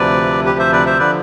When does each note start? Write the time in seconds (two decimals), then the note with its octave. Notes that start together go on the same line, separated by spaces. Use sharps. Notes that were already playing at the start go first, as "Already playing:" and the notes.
Already playing: D2 C3 F3 B4 D5
0.46 G4 B4
0.59 C5 E5
0.72 B4 D5
0.86 C5 E5
0.99 D3 F3 B4 D5